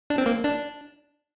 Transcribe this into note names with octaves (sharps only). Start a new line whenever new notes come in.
D4
C4
A#3
D4